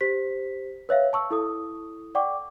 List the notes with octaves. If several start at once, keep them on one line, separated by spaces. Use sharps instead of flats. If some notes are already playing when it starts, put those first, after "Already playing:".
G4 C5 B6
B4 C#5 E5 F5
A5 C#6 E6
E4 A4 D#6
D5 F#5 G5 C#6 D6